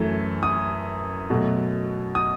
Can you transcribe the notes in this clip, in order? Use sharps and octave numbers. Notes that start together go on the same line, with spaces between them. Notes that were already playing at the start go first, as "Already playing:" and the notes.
Already playing: F#2 E3 A3
D#6
B2 F#3 A3
D#6